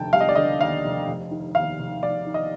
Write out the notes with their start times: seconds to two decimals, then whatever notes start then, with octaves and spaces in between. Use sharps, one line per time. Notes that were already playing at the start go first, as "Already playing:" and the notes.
Already playing: F1 D#2 D3 G5 A5
0.13 G3 F5
0.20 D#5
0.29 D5
0.35 D3 D#5
0.61 D#2 F5
0.84 F1
1.08 F1
1.31 D#3
1.55 D#2 F5
1.79 F1
2.03 F1 D5
2.26 D#3
2.34 D#5